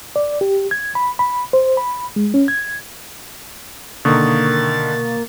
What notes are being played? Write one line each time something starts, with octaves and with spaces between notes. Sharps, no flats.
D5
G4
G#6
B5
B5
C5
B5
G#3
C#4
G#6
B2 D3 D#3 A#3 C#6 D#6 A6